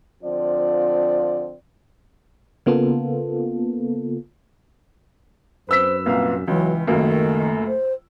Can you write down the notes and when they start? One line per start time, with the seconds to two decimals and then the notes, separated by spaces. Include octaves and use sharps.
0.23 D3 F3 C4 F4 D5
2.66 C#3 A#3 B3 F4 A4
5.69 F#2 B4 C5 E6 B6
6.06 C2 A#2 B4 F5
6.48 C#2 E3 F#3
6.87 C#2 F#2 D#3 A3 A#3
7.67 C5